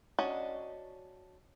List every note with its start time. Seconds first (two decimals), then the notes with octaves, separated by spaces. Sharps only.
0.19 C#4 D4 F#4 D#5